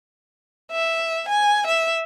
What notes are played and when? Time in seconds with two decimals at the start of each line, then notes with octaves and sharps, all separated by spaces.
0.72 E5
1.29 G#5
1.67 E5